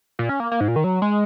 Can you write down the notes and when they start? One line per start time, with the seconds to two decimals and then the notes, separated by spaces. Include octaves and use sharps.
0.19 A#2
0.29 C#4
0.40 A#3
0.52 A#3
0.60 G#2
0.68 A#2
0.76 D#3
0.84 F#3
1.02 G#3